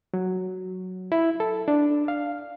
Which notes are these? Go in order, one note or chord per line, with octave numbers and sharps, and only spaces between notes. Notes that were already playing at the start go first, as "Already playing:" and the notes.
F#3
E4
A4
D4
F5